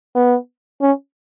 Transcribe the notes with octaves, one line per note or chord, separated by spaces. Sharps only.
B3
C#4